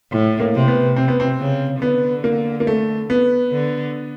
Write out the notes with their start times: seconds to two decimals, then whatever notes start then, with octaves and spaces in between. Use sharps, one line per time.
0.11 A2
0.40 A#3
0.54 C3
0.68 B3
0.96 C3 C4
1.08 B3
1.20 C4
1.39 C#3
1.81 D3 B3
2.24 A#3
2.60 A#3
2.67 A3
3.10 B3
3.52 D3